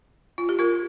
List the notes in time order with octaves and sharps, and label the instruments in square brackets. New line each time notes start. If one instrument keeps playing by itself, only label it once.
[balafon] F4
G4
F4 A#4